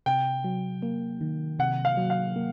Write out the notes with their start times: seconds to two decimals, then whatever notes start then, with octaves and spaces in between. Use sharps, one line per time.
0.06 C3 G5
0.44 F#3
0.82 A#3
1.21 D#3
1.59 C3 F#5
1.85 F5
1.97 F#3
2.10 F5
2.36 A#3